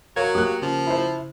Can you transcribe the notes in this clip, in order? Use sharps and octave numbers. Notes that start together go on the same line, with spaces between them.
F#3 A#4 C#5 F5 C#6 G#6
A#3 G4 D#6 F#6
C#3 F3
E4 C5